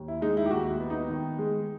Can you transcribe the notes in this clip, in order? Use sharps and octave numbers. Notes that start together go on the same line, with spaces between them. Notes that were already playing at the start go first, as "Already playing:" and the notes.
Already playing: D#2
E4
G#3 D#4
E4
G4
D#2 F#4
B3
D#4
D#3
G#3